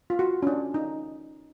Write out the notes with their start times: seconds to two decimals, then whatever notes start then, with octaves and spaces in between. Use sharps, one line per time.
0.10 F4
0.19 F#4
0.42 C#4
0.47 D4
0.74 D#4